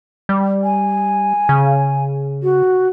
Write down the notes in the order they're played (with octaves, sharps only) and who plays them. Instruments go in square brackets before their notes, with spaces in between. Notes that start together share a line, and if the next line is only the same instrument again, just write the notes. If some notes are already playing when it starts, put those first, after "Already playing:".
[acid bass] G3
[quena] G#5
[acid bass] C#3
[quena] F#4